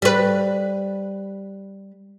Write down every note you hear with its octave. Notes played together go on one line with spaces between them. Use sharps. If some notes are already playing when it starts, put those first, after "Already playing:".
G3 B4